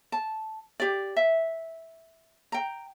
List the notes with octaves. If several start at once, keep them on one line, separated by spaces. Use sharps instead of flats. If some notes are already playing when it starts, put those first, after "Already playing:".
A5
G4 D5
E5
G5 A#5